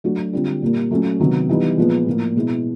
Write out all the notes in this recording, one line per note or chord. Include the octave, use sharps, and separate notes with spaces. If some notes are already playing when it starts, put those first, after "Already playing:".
F#3 A3 D4 F#4
D3 G3 C4 F4
A#2 G3 A#3
F#3 A3 C#4
C3 D#3 F#3 B3
E3 G3 B3 D#4
A#2 F3 G#3 B3
A2 F3 A#3
B2 G#3 B3 E4